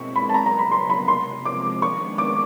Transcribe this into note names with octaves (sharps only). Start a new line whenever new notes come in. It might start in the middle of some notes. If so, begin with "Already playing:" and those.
Already playing: B2 G#3 C4 E4 C#6
B5
A5
C#3 F#3 B3 A#5
A#5
B5
C6
B5
C3 F3 G#3 C6
D6
D#3 G#3 B3 D4 C#6
D6